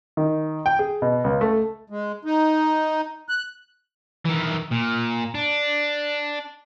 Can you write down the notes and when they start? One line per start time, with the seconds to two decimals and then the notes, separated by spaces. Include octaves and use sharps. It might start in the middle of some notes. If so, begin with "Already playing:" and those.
0.17 D#3
0.66 G5
0.79 G#4
1.02 B2
1.24 C#2
1.41 A3
1.90 G#3
2.25 D#4
3.29 F#6
4.25 D#3 E3
4.72 A#2
5.35 D4